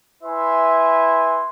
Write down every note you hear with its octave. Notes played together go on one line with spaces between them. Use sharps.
E4 B4 E5 G#5 C6